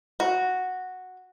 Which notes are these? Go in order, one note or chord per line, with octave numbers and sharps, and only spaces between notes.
F#4